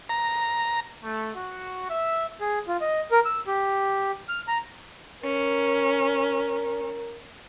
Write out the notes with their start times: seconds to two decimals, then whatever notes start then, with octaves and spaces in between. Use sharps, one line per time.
0.09 A#5
1.04 A3
1.35 F#4
1.89 E5
2.41 G#4
2.67 F4
2.81 D#5
3.11 A#4
3.25 E6
3.47 G4
4.28 F6
4.48 A#5
5.23 C#4 A#4